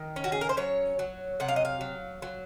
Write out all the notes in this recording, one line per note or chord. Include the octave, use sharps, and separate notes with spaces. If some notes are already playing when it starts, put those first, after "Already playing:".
Already playing: D#3
C#4
F#4
G#4
A#4
C5
F#3 C#5
F#3
C3 F#5
F5
D#5
F5
F#3
F#3